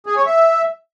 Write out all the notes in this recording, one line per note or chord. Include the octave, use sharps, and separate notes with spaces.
G#4
C#5
E5